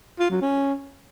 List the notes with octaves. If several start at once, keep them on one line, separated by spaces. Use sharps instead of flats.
F4
F#3
C#4